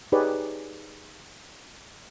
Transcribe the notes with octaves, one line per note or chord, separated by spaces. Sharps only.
D#4 G4 G#4 B4 C#5 D5